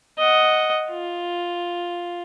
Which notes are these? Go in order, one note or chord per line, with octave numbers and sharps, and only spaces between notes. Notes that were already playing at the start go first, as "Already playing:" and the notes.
D#5 F#5
F4